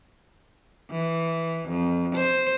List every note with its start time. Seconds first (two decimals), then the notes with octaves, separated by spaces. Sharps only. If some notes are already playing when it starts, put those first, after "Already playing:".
0.90 E3
1.69 F2
2.16 C5